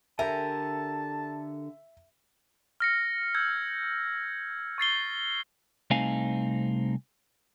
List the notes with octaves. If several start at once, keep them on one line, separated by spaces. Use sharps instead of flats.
D3 G4 A4 A#4 E5 G#5 A5
F6 A#6 C#7
E6 G6 G#6
C#6 A6 C7 G7
C2 A3 C4 D#4 F5 G#5